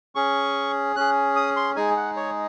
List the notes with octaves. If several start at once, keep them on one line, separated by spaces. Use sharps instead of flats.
C#4 G#4 C#6
C#4 G#4 F#6
D#6
C6
G#3 D#4 G#4 G#5
F#5
C#5